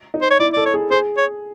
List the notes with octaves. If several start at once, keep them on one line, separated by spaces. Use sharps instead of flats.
D#4
C5
C#5
E4 D5
A4 D5
C#5
G#4
G#4 C5
C#5